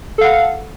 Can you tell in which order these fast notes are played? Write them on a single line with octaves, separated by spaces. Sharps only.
A4 F5 F#5